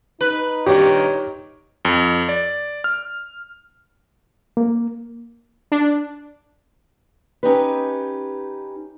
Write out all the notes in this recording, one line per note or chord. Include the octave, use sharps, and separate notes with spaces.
D#4 B4
G2 A#2 D#3 G4 C#5
F2
D5
F6
A#3
D4
C#4 D#4 G4 B4